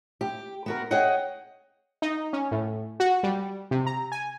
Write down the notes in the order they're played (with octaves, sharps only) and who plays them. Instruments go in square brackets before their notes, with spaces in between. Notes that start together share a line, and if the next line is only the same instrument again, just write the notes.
[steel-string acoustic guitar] G4
B3 F#4 A#4
G#4 C#5 D#5 F#5 G5
[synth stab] D#4
C#4
A2
F#4
G3
C3
A#5
G#5